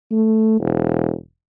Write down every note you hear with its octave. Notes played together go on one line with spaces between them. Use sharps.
A3
E1